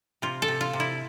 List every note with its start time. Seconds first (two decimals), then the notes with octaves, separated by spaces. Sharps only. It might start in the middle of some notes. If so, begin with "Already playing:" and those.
0.22 C3 F4
0.42 A4
0.48 C3
0.61 F4
0.73 C3
0.80 E4